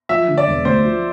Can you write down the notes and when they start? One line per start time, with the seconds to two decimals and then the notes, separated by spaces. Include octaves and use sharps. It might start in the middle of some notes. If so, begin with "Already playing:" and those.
0.09 F3 E5
0.28 D3
0.38 D5
0.47 E1
0.65 D2 C5
0.85 F3